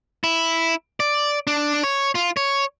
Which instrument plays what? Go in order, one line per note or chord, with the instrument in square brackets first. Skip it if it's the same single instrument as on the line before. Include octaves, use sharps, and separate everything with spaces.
[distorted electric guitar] E4
D5
D4
C#5
F4
C#5